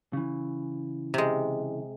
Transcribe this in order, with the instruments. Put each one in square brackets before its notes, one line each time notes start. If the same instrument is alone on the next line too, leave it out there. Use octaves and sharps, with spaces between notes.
[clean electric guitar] C#3 E3
[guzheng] C3 G#3